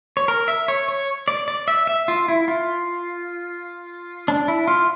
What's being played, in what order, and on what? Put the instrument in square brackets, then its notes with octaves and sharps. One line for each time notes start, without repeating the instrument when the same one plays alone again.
[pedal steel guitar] C#5
A#4
E5
C#5
C#5
D5
D5
E5
E5
F4
E4
F4
D4
E4
F4